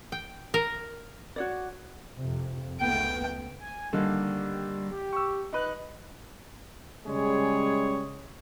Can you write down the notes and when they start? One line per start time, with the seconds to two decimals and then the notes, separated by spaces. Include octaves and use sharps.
0.12 G5
0.54 A#4
1.36 F#4 C#5 D5
2.17 F2 C3
2.81 C#2 A3 B3 G5
3.59 G#5
3.93 D3 D#3 G3 A#3
4.91 G4
5.13 C#6 E6
5.53 D#4 B4 F#6
7.06 C#3 G3 G#3 G#4 C#5